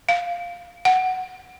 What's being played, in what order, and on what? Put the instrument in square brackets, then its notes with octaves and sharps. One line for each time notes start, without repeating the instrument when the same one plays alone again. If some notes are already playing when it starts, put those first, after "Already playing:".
[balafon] F5
F#5